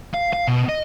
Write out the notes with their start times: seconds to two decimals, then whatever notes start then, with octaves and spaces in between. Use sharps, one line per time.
0.14 F5
0.33 F5
0.47 B2
0.69 D#5